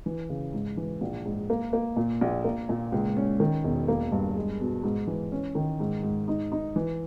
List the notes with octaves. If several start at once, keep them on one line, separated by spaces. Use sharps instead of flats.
E3
C#3
G#2
E3
A#1
G#2
A#3
A#3
A#2
A#1
A#3
A#2
C#2
C#4
D#3
E1
A#3
G2
G#3
B2
G#2
E3
C#4
D#3
G#2
G#2
D#4
D#4
E3